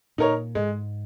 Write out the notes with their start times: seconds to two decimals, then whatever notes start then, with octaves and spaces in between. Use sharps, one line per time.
0.18 A#2 D#4 A#4 C#5
0.55 G#2 G#3